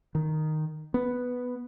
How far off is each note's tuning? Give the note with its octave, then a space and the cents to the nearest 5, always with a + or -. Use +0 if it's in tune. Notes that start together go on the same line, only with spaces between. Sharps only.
D#3 -5
B3 +0